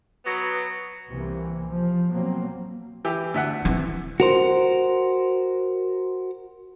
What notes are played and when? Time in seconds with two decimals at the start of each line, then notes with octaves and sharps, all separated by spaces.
0.25 F#3 B3
1.09 C2 C3 E3 A#3
1.70 F3
2.11 B2 F#3 A#3 C4
3.05 E3 G4
3.34 D2 E5 F#5
3.65 E3 C4
4.20 F#4 A#4 C5